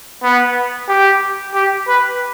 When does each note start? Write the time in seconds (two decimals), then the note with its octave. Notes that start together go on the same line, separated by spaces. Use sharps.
0.23 B3
0.88 G4
1.55 G4
1.88 B4